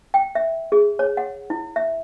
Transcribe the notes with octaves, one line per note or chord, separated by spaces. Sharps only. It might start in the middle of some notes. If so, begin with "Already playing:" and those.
G5
E5
G#4
C#5
F#5
E4
E5